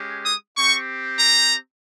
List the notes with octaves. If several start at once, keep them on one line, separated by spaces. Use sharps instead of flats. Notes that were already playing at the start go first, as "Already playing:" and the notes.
Already playing: G#3 C#4 G4
D#6
C4 G4 C#6
A#5